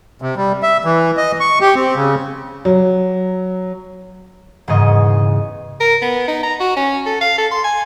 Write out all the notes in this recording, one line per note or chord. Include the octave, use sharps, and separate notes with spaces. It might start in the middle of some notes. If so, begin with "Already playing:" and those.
C3
G3
E5
E3
D#5
C#6
G4
C4
C#3
F#3
E1 G#2 C#3 C#5 D#5 C#6
A#4
B3
D#4
A#5
F#4
C#4
A4
F5
A4
C6
G#5